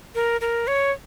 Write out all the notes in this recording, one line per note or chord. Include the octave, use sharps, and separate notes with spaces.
A#4
A#4
C#5